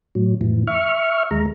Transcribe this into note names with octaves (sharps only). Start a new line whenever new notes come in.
A2 F#3
F2 A2 E3
E5 C#6 F6
D#2 G#3 A#5